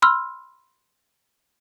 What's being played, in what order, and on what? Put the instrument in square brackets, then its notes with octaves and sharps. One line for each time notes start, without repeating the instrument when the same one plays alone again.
[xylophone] B5 C6 E6 F6